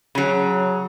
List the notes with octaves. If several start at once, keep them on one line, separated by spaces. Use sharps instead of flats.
C#3 F#3